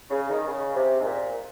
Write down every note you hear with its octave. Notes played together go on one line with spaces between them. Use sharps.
C#3
D#3
C#3
C3
G#2
A#2